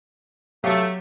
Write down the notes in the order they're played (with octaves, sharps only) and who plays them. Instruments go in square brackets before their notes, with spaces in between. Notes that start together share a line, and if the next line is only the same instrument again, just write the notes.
[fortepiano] F#3 G4 F5 [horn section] A3